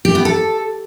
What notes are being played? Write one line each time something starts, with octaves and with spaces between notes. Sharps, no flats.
G4
B3
A4